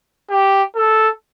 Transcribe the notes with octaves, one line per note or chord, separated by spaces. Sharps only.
G4
A4